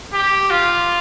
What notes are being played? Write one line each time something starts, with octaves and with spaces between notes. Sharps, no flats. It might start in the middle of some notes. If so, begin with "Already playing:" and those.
G4
F4